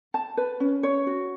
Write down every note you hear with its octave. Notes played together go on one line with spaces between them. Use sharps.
A5
B4
C#4
C#5
F#4